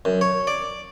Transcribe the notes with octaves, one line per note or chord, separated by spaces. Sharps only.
F#2
C#5
D5